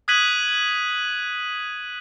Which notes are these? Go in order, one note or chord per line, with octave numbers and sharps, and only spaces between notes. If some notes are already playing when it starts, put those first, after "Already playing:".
D#6 F#6 G#6 B6 D#7 F#7